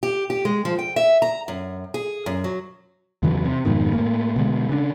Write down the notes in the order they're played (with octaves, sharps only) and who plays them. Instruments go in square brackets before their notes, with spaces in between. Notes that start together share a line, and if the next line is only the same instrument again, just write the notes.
[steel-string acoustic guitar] G4
G4
G#3
F3
G5
E5
A#5
F#2
G#4
F#2
F#3
[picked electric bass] E2 C#3 E3 F#3
C3
F2 G#2 B2 D#3
A2 A3 A#3
B2 D3 G#3
C#3 D4